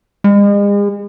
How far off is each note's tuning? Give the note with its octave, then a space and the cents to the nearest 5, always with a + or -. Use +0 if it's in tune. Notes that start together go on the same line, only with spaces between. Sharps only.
G#3 -40